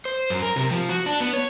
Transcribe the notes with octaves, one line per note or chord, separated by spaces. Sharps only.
C5
F#2
A#4
C3
F3
F#4
D4
B3
C#5